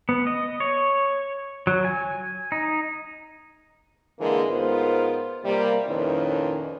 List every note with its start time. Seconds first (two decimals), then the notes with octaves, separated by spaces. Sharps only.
0.09 B3
0.27 D#5
0.60 C#5
1.67 F#3
1.85 G#5
2.52 D#4
4.19 D3 E3 G#3 A#3
4.49 G#2 B3 F4 A#4 C5
5.44 C3 G3 A#3
5.86 F2 A#2 D#3 C#4 E4 B4